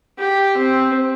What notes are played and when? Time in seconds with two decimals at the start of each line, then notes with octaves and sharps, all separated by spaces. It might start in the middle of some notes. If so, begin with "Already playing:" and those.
0.18 G4
0.57 C4